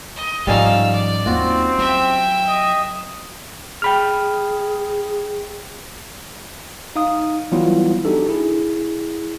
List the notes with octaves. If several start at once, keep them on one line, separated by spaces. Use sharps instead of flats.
D#5
G#2 F3 G3 C#4 D#4 F5 E6
D5
D#2 C4 F4 F#4
F#3 E5 G5
D#5
G#4 G5 B5 F6
D#4 F5 D#6
E3 F#3 G3 B3 E4 F4
D4 D#4 F#4 G4 A4
E4 G#4